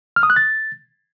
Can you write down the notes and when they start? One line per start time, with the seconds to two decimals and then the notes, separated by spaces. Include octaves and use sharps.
0.16 F6
0.23 D#6
0.30 F#6
0.36 A6